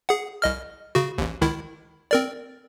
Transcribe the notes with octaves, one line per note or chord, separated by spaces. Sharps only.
G#4 F#5
C2 D#5 F6
C#3 F#4
A1 D#2
C#2 D#3 E4
C4 A#4 D5